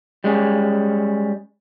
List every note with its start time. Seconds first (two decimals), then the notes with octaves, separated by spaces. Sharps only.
0.24 G3 G#3 C#4